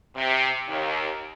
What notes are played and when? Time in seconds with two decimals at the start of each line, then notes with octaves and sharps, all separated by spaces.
0.16 C3
0.69 D#2